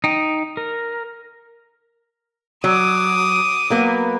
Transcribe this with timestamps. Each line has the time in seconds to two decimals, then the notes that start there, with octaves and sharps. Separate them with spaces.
0.04 D#4 G5
0.57 A#4
2.64 F#3 D6 D#6
3.70 F#3 A#3 B3